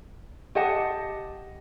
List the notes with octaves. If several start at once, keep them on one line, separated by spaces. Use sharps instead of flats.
G4 D#5 F#5 A5